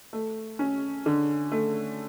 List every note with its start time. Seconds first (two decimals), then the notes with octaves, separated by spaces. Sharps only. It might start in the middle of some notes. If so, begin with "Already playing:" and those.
0.13 A3
0.59 C#4
1.06 D3
1.52 A3